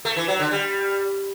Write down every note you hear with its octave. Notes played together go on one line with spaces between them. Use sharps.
A3
E3
F#3
D3
G3